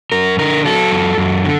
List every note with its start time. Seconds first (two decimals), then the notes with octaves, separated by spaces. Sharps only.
0.12 F#2 A#4
0.38 D3 A#4
0.65 F#3 A4
0.92 F#2
1.18 F#2
1.44 D3